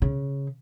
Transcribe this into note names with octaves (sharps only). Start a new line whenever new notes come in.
C#3